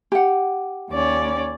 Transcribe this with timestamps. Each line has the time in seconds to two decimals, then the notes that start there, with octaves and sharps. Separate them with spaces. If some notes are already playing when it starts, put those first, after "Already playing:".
0.12 G4 F#5
0.90 D#2 C#4 D5